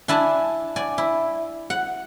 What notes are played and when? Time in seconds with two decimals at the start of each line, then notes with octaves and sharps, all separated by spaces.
0.08 D4 E4 G#5 A5
0.76 D5 G#5
0.98 E4
1.70 F#5